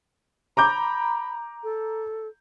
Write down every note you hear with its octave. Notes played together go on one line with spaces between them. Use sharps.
A#5 B5 D6 G6
A4